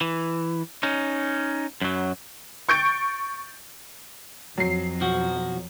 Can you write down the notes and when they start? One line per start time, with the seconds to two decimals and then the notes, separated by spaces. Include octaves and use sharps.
0.01 E3
0.83 C#4 D#4
1.81 F#2 F#3
2.69 C#6 G6 A6 D7
4.58 F2 F#3 C7
5.01 B1 F3 F#4